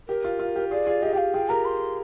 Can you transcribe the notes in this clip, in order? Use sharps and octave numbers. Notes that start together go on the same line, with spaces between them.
G4 A#4
F4
F4
G4
F4 G#4 D5
F4 G#4
G4 D#5
G4 F5 G5
F4 G#4 G5
G4 A#4 A#5
C6